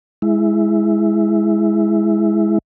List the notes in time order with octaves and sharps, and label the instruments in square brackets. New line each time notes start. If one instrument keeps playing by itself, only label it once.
[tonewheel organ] G#3 E4